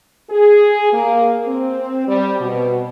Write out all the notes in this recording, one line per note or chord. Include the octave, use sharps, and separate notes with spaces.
G#4
A#3
C4
G3
B2